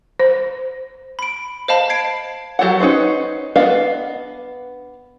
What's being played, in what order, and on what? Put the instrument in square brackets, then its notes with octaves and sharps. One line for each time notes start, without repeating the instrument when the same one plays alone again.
[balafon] C5
[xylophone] B5 D7
C5 D#5 F5 A5 B5
G#6 C7 D7
[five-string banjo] F#3 G4 A4 C#5 F#5
C#4 D#4 B4 C5
B3 D4 B4 D#5 F5